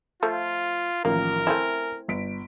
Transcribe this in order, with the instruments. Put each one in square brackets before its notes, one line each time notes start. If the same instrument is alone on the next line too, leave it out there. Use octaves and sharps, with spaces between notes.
[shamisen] F3 A3 [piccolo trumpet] F4
[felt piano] A1 D#3 F3 [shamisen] A#3 [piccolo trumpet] A#4
[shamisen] A3 C4 E4 [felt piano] G#5
[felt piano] G1 B6 D7